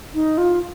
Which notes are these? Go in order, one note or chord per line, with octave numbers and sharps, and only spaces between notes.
D#4
F4